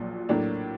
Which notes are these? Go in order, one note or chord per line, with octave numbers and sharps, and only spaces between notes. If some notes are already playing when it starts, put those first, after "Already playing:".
Already playing: A#1 A#2 F#3
A2 F#3 A#3 D4